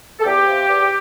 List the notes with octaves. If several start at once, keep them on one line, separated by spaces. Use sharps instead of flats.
A4
E2 G4
C3 F3
E2